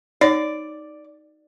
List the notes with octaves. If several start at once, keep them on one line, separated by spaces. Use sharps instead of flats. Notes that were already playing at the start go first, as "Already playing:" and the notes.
D#4 C#5 D5